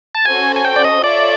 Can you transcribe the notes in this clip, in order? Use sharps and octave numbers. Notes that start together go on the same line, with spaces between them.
A5
C#4 F#4 A4 C5 G#5
G#5
G5
D5
D#5
F4 A4 C#5 D5 E5